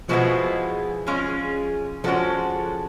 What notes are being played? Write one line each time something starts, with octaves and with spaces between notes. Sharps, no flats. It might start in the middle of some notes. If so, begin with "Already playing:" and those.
B2 F3 G#3 B3 E4 G#4
G#3 C#4 F4 G#4
F3 G#3 C#4 F#4 A4